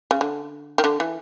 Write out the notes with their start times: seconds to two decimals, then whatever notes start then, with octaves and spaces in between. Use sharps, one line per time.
0.11 C#3
0.21 D3
0.78 D#3
0.84 D3
1.00 E3